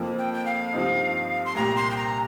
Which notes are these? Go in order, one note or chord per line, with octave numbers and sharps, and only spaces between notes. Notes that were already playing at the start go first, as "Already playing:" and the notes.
Already playing: F2 F3 A#3 F4
G5
G5
F5
G2 F3 C4 D#4
C6
C2 A#2 A#3 G4 A#5
C6
G5
A#5